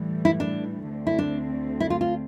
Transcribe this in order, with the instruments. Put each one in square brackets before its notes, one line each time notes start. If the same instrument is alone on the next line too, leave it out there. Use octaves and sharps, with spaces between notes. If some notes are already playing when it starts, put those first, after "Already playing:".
Already playing: [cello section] A2 E3 G3
[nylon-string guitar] E4
D4
[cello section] D2 D3 A3 C4
[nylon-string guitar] E4
D4
E4
F4
F4